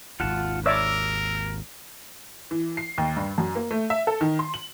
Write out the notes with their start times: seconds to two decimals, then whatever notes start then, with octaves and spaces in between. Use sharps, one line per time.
0.20 G#1 D#2 F4 F#5 A5
0.66 A#4 C#5 D5 E5 D6 E6
2.51 E3
2.77 C7
2.98 D#2
3.17 G2
3.38 F#2
3.56 A#3
3.71 A3
3.90 E5
4.07 A4
4.21 D#3
4.39 C6
4.54 F#7